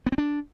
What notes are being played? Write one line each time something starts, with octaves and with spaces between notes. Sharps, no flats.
B3
C4
D4